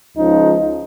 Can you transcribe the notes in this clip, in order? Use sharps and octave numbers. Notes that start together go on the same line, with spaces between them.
C#2 C#3 F3 D#4